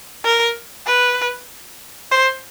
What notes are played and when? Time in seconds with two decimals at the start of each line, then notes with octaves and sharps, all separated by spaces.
0.24 A#4
0.86 B4
2.11 C5